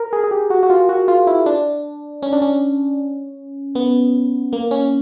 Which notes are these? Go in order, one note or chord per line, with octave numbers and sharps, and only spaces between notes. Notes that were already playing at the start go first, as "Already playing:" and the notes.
Already playing: A#4
G#4
G#4
G4
F#4
F#4
F4
F#4
F4
E4
D4
C#4
D4
C#4
B3
A#3
C#4